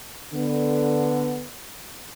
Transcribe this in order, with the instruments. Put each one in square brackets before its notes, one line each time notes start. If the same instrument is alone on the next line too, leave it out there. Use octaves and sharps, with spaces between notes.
[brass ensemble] D3 B3